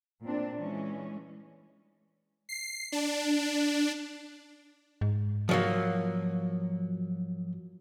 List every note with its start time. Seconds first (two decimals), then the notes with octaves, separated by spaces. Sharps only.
0.23 A#2 C4 D4
0.58 E3 G#3 C#4
2.49 C7
2.92 D4
5.01 G#2
5.49 F3 F#3 A#3